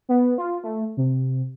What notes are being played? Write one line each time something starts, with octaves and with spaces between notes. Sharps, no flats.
B3
F4
A3
C3